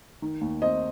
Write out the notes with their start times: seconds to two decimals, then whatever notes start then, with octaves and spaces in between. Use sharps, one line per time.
0.22 D#3
0.41 D#2
0.62 C4 D#5